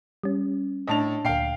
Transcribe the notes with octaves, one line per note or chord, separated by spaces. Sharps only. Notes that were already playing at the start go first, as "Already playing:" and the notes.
G3 C#4
A2 D4 D#5 A5 F7
D2 A#2 F5 G5 C7